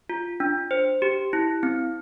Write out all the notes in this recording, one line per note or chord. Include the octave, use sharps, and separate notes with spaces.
F4
D4
C5
G4
E4
C4